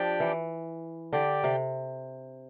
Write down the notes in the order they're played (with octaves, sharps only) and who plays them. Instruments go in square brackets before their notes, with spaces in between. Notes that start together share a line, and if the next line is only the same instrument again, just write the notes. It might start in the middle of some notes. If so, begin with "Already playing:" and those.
Already playing: [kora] F3 [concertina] D4 G4 D5 G5
[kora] E3
[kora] D3 [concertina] G4 D5 G5
[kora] C3